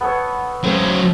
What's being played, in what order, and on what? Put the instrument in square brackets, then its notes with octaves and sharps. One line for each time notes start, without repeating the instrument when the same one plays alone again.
[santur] B3 A4 C#5
[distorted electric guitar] F#3 F4 [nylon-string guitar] A3 C4 C#4 [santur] C5